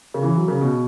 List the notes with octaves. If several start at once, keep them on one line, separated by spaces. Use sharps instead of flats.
C#3
E3
F#3
C#3
B2